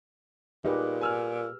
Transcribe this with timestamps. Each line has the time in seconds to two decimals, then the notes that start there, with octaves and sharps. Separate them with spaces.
0.65 A#2 D#4 G4 G#4 B4
1.01 G#5 E6 F6